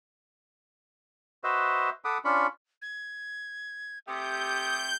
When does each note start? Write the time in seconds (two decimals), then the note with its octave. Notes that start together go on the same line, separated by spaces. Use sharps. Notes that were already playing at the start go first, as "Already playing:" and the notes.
1.44 F#4 B4 C5 D#5 E5
2.05 A4 F#5 B5 D6 D#6
2.25 C#4 D4 F4 B5 C#6
2.82 G#6
4.07 C3 A3 G4 D#6 G6